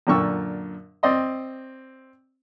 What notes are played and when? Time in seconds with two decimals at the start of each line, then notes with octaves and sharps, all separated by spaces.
0.07 F#2 A#2 D3 C#6 E6
1.03 C4 D5 D#5 C6